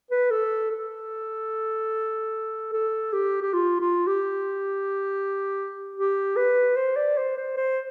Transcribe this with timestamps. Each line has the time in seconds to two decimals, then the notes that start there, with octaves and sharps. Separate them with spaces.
0.11 B4
0.31 A4
0.71 A4
2.73 A4
3.13 G4
3.42 G4
3.54 F4
3.80 F4
4.07 G4
5.96 G4
6.36 B4
6.76 C5
6.96 D5
7.17 C5
7.37 C5
7.57 C5